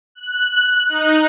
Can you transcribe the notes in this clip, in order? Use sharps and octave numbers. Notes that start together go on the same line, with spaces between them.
F#6
D#4